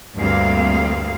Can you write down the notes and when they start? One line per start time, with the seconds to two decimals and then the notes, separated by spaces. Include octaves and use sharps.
0.16 D2 G2 A#3 C4 F5